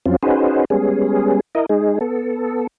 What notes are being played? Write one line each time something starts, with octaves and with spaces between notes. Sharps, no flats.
F2 F#3 C4 C#4 F4
C#4 D#4 F#4 G#4 B4 C5
G3 G#3 B3 C#4 G#4
E4 A#4 D#5
G#3 D#4 G#4
B3 A4